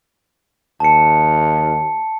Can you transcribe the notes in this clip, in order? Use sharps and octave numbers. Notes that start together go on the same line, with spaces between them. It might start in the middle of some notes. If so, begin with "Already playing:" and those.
D#2 A5 C#7